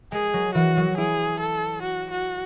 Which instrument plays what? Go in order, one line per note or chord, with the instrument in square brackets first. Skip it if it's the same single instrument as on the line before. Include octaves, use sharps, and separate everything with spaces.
[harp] G#3 [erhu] G#4
[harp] F#3
[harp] E3 [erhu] F#4
[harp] F#3
[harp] E4 [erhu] G#4
[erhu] A4
F#4
F#4